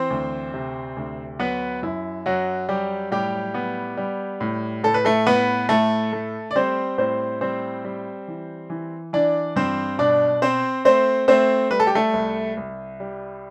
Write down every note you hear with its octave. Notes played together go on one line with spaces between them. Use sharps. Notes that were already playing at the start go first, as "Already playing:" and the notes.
Already playing: E3 C4 C5
D2
C3
D2
F#3 B3 B4
F#2 E4
F#2 F#3 F#4
F#3 G3 G4
A2 G3 G4
B3
G3
A2
A2 A4
B4
A3 A4
A2 B3 B4
A2 A3 A4
A3
D5
G3 C4 C5
A2 C4 C5
G3 C4 C5
G3
E3
E3
E3 D4 D5
G2 C4 C5
B2 D4 D5
C4 C5
A3 C4 C5
A3 C4 C5
G3 B4
A4
G4
A3 A4
C2
C2
G3